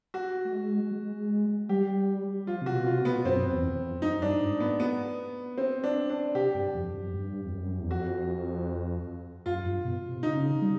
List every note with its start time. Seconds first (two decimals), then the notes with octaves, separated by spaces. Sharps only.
0.14 F#4
0.45 A3
0.53 G#3
0.91 G#3
1.69 G3 G4
2.47 F3 F4
2.62 C3 F#4
2.73 B2
2.86 C3 F4
2.99 B2
3.05 B3
3.25 F#2 C4
3.51 E2
3.77 F2
4.02 F#2 D#4
4.22 G2 D4
4.41 G#2
4.60 B3
4.80 B3
5.58 C4
5.84 D4
6.10 D4
6.35 C3 G4
6.54 G2
6.74 F2
6.94 F#2
7.14 G2
7.46 F2
7.52 F#2
7.80 E2
7.90 F2 F#4
9.46 F#2 F4
9.66 G2
9.84 B2
10.04 C3
10.23 C#3 D#4
10.62 G3